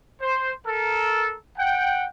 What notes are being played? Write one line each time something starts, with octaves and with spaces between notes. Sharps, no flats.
C5
A4 A#4
F#5 G5